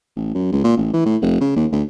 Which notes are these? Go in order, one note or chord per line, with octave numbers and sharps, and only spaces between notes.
A1
F#2
C#2
A#2
A1
E3
A2
F1
C#3
D#2
D2